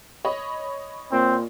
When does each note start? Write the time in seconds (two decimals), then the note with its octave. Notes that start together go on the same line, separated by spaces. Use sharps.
0.25 C#5 D#5 B5
1.12 A#2 C4